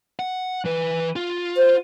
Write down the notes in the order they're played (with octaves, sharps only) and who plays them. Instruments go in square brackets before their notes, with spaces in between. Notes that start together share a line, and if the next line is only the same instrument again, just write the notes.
[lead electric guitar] F#5
E3 B4
F4
[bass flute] C5